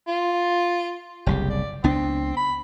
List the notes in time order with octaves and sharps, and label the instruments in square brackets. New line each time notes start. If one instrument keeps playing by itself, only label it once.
[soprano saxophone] F4
[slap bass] F#1 C2 C#3 [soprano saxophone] G4
[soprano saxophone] D5
[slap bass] C#2 B3 D4 [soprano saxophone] C4
[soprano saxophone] B5